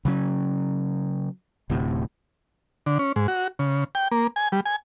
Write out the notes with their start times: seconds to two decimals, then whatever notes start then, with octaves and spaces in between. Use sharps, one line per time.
0.05 C#3 F#3 C#4
1.70 D1 D2 A2 C3
2.86 D3
2.99 C#4
3.16 G#2
3.28 F#4
3.59 C#3
3.95 G5
4.11 A#3
4.36 G#5
4.52 G3
4.65 G#5